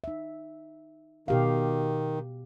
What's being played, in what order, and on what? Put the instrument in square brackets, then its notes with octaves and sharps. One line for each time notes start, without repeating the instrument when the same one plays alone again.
[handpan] D#4 E5
[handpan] B2 G4 F5 [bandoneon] D#3